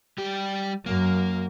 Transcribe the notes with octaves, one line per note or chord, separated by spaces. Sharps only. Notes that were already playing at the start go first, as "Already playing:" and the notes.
G3 G4
F#2 A#3